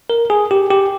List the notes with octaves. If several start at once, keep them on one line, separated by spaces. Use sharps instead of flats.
A#4
G#4
G4
G4